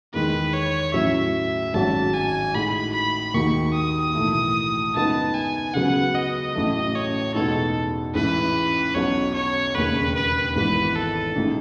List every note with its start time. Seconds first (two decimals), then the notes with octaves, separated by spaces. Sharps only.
0.14 E2 D#3 G#3 B4
0.53 C#5
0.94 A2 F#3 C#4 E4 E5
1.74 G#1 G#2 F#3 C#4 F#4 A5
2.14 G#5
2.54 A2 G#3 D#4 F#4 B5
2.93 B5
3.34 D#2 D#3 G#3 D#4 F#4 C#6
3.74 D#6
4.14 B1 A2 E3 A3
4.95 F#2 C#3 G#3 B3 D#4 A5
5.34 G#5
5.74 C#2 C#3 F#3 B3 F#5
6.15 D#5
6.55 A1 A2 F#3 A3
6.95 C#5
7.35 E2 B2 G#3 B3 D#4 A4
8.15 A1 G#2 E3 B4
8.95 B1 B2 F#3 C#4 F#4 C#5
9.35 C#5
9.75 E1 D#2 C#3 B4
10.15 B4
10.56 G#1 G#2 E3 B3 B4
10.96 A4
11.36 A1 A2 G#3 D#4